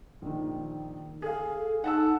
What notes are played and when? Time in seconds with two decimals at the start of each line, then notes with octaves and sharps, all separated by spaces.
0.22 A#1 D#3
1.22 G#4 A4 F5
1.84 D#4 F#5 A5 E6